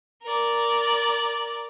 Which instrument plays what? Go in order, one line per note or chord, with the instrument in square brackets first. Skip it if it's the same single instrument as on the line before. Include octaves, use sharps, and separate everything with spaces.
[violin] A#4 D5